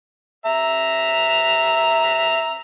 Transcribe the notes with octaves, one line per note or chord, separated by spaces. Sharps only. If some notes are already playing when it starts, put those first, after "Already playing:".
E5 A#5